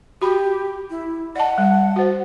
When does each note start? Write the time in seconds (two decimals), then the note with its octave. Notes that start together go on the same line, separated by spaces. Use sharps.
0.22 F#4 G4 B5
0.90 E4
1.36 D5 D#5 F#5 A5
1.58 G3
1.96 F#4 C5